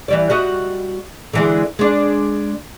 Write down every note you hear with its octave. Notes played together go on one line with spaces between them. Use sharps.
E3 G3 D5
G3 F#4 D#5
D3 E3 G#3
G#3 D4